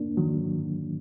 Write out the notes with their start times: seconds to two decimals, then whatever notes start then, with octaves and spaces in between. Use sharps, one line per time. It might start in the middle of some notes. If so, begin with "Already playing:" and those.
Already playing: A#3 D4
0.17 D#3 F#3